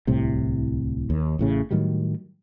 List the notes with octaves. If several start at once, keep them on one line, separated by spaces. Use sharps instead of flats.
D1 C2 A2 C3
D#2
A1 A2 C#3
A2 D#3 F#3 G3